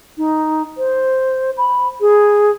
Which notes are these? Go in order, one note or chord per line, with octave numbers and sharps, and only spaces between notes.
D#4
C5
B5
G#4